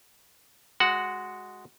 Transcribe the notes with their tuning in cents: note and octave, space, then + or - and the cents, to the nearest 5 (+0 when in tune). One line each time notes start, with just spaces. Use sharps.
G#3 +0 F#4 +0 F#5 +0